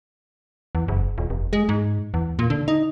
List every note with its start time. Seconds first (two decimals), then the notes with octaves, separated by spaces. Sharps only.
0.75 E2
0.88 F#1
1.18 D#1
1.30 F1
1.53 G#3
1.69 G#2
2.14 E2
2.39 A#2
2.50 D3
2.68 D#4